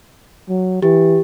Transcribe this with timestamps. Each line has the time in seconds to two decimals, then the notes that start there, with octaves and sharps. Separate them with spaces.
0.49 F#3
0.82 E3 G4